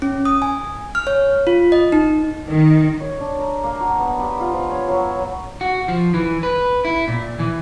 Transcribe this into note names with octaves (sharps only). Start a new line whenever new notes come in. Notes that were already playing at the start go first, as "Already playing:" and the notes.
C#4
D#6
G#5
F6
C#5
F4
D#5
D#4
D#3
C#5
D4
A#4
A#3
F#4
B3
G4
F4
F3
C#5
F#3
F#4
F3
E3
B4
E4
A#2
E3